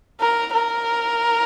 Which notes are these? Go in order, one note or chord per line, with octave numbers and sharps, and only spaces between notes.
A#4
A#4